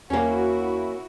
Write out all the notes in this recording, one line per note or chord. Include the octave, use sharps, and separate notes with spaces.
E2 A#3 C#4 E4 F#4